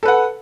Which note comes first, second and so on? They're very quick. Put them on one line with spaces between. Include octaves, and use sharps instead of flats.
A4 B4 F#5